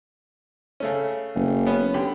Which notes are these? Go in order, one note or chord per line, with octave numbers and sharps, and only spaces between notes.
C#3 A3 C#4
F#1
B3 C#4
D3 G4 B5